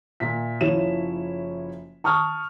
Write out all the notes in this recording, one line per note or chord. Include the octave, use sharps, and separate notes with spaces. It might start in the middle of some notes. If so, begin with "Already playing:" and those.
A#2 E5 B6
F#1 F3 E4 C#5 E7
A5 C#6 D#6 F6